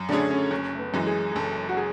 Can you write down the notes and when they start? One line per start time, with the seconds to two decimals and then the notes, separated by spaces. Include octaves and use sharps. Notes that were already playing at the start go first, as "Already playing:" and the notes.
Already playing: F#2
0.09 D3 A3 C#4 D4 G#4
0.31 C#4
0.51 F#1 C#4
0.75 A3
0.79 B3
0.94 F#2 E3 G#3
1.07 G#4
1.32 G#4
1.36 F#1 A4
1.69 F#4
1.77 G#4